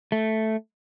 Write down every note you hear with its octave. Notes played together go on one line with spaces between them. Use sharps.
A3